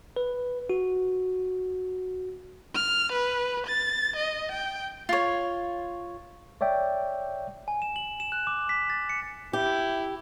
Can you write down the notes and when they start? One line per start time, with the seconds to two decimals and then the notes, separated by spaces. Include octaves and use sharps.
0.16 B4
0.70 F#4
2.74 F6
3.13 B4
3.67 A6
4.16 D#5
4.52 G5
5.09 F4 C#5
6.61 C#5 D5 E5 G5
7.68 G#5
7.82 E7
7.96 F#7
8.20 E7
8.32 F#6
8.47 D6
8.69 B6
8.90 A6
9.09 C#7
9.53 E4 G4